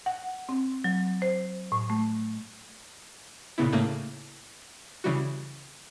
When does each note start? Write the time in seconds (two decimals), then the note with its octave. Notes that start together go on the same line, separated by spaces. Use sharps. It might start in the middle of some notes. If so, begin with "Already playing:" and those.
0.06 F#5
0.49 C4
0.84 F#3
1.22 C5
1.72 A2
1.90 A3
3.58 A#2 C#3 B3 E4
3.73 A2 C#3 A3 A#3
5.04 C#3 E3 G3 F#4